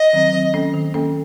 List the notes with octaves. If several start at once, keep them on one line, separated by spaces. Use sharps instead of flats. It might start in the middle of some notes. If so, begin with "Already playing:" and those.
Already playing: D#5
D#3 F#3 C4
D#3
A#3 C#4 A4
D#3
A#3 C#4 A4